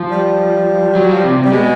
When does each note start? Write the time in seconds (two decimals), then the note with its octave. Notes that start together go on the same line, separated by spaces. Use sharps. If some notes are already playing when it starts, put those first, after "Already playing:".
Already playing: F3
0.11 G3
0.95 F#3
1.09 F3
1.24 C3
1.37 C3
1.45 G3
1.51 B2 G#3